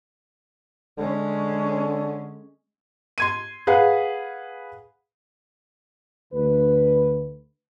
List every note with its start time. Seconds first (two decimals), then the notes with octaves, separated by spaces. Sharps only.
0.98 D3 G#3 C#4
3.18 C6 G#6 D#7
3.67 G#4 B4 F5 F#5
6.34 D2 D3 B4